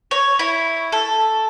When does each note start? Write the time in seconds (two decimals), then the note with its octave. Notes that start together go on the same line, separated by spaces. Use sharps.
0.11 C#5
0.39 E4
0.92 A4